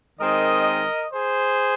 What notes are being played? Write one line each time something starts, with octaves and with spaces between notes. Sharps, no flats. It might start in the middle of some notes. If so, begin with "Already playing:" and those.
D#3 G#3 C4 A#4 D#5
G#4 C5